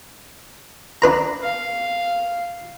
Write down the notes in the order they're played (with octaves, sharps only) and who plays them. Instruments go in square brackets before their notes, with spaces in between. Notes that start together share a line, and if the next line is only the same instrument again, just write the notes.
[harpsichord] D4 B4 A#5
[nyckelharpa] F5